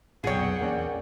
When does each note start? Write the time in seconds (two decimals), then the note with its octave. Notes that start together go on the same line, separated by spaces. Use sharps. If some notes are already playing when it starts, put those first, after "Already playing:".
0.24 B1 F2 A#2 G#4 C#5 F#5 G5
0.61 E2 A#3 C#4 D5